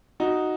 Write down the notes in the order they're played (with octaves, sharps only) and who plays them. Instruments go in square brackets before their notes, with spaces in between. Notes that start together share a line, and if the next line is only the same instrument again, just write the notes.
[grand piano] D#4 F#4